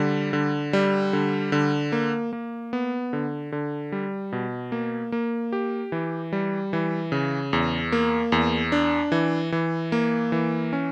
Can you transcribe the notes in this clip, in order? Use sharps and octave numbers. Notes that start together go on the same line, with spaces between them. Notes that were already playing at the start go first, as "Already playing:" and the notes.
Already playing: D3 G3
D3
G3
D3
D3
A#3
A#3
B3
D3
D3
G3
B2
A#3
A#3
G4
E3
G3
E3
C#3
E2
A#3
E2
D4
E3
E3
A#3
E3
C#4